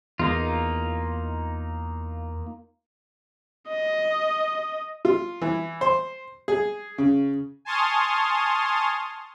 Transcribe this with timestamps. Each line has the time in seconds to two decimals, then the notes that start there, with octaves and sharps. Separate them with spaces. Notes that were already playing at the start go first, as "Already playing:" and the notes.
0.19 E2 A#3 D#4 F4
3.68 D#5
5.05 F4
5.42 E3
5.81 C5
6.48 G#4
6.98 C#3
7.65 G#5 A5 C6 C#6 D#6 F6